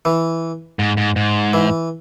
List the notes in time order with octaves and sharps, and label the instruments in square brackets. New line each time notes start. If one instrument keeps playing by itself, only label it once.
[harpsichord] E3
[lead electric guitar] G#2
G#2
G#2
[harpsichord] E3